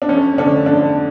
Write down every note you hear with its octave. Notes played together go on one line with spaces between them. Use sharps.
D4
F2 C#4
D3 A3 C#4 D4
F2 D4